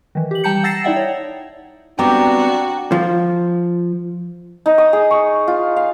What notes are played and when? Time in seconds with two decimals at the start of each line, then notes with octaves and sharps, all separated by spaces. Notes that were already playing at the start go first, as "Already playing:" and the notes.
0.15 D#3 E3
0.31 G4 F#7
0.44 G3 G5 A5 A#5 G6 C#7
0.63 F#5 E6 A6 A#6 C7 E7
0.84 D#4 E4 D5 E5 F#5 G5
0.96 C#5
1.99 G3 B3 C4 D4 F#4 G5 A#5 D6
2.92 F3
4.66 D#4
4.78 D#6
4.93 G#4
5.11 C#6
5.48 F4
5.76 F5